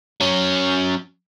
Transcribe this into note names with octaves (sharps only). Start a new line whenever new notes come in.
F#3 C#4